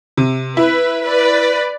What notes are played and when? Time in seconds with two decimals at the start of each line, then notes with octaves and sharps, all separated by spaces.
0.17 C3
0.57 E4 B4
1.04 B4 D5